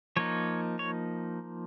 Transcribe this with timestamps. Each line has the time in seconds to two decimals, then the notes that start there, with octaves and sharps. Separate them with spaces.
0.16 F3 A#3 D#4 C#5
0.79 C#5